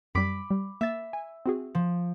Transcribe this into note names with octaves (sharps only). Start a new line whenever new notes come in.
F#2 G3 B5 D6 B6
G3
A#3 E5 A6
G#5
C4 F#4 G#4
F3